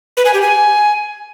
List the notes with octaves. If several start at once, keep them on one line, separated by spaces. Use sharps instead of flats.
B4
G#5
G4
G#5